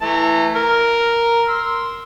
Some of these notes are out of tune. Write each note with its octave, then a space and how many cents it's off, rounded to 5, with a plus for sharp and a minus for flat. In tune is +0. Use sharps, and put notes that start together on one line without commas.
E3 +0 A3 +0 A#5 -30
A#4 +0 A#5 +0
C6 +0 E6 -10